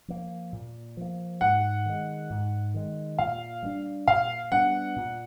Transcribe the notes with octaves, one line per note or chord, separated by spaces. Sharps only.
F3 A#3
A#2
F3 A#3
G#2 F#5
D#3 G#3
G#2
D#3 G#3
A#2 F5
G3 B3 D4
A#2 F5
G3 B3 D4 F#5
A#2